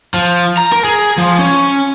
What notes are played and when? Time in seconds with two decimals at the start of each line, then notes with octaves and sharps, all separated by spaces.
0.14 F3
0.57 A#5
0.72 A#4
0.85 G#4
1.18 F3
1.39 C#4